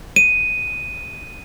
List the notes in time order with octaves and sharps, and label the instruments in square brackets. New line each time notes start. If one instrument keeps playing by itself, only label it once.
[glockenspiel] D#7